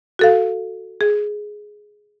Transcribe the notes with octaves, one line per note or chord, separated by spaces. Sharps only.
F#4 A4 F5
G#4